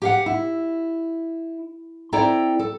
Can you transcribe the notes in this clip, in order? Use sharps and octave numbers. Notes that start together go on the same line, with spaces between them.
G4 F5 F#5
E4
C4 E4 A4 D5 G5 A#5
A4